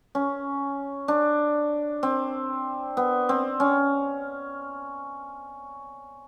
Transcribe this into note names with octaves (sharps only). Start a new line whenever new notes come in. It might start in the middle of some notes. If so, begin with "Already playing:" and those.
C#4
D4
C4
B3
C4
C#4